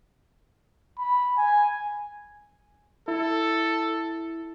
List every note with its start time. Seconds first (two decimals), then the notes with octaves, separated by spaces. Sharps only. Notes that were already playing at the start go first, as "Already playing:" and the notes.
0.99 B5
1.38 G#5
3.08 E4 A4